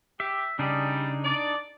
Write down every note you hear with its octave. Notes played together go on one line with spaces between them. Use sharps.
G4 E5
C#3 G3 D4 D#4 G#4
D5